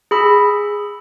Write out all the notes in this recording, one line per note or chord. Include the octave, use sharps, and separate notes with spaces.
G#4 B5 E6